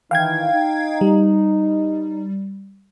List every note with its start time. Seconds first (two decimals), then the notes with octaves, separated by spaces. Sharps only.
0.11 D#3 E3 F5 G5 G#6
0.54 D#4
1.01 G3